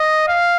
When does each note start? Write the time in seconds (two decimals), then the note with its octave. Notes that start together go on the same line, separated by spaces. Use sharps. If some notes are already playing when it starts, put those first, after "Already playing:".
Already playing: D#5
0.28 F5